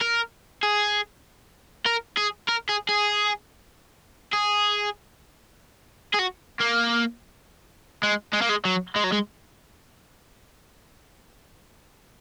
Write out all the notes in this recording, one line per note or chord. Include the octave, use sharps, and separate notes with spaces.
A#4
G#4
A#4
G#4
A#4
G#4
G#4
G#4
G#4
F#4
A#3
G#3
G#3
A#3
G#3
F#3
G#3
F#3
G#3